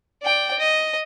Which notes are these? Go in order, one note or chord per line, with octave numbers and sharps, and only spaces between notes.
D5 G5
D#5